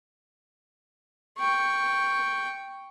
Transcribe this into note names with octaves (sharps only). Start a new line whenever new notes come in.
G5 C#6